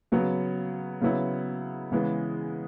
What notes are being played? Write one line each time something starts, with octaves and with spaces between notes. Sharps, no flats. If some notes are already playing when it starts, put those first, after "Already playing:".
C#3 F#3 B3
C#3 F#3 B3 E4
C#3 E3 G#3 B3